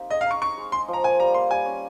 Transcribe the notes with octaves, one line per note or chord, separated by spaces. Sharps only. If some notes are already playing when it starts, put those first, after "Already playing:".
Already playing: A#3 C4 D#4 G4
G#4 D#5
F5
D#4 C#6
D#4 C#6
G#3
G#3 C6
F3
A#5
A#3 G#5
G3 A#5
A#3 C6
G3 G#5
C#4